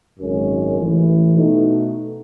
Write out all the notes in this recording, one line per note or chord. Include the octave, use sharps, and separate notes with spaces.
G#1 F#2 C#3 G#3 C#4
A1 A2 E3
B2 A3 D#4 F#4